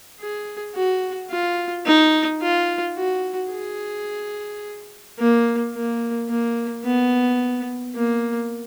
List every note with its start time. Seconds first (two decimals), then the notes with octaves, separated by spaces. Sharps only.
0.20 G#4
0.75 F#4
1.30 F4
1.86 D#4
2.41 F4
2.97 F#4
3.52 G#4
5.19 A#3
5.74 A#3
6.28 A#3
6.84 B3
7.95 A#3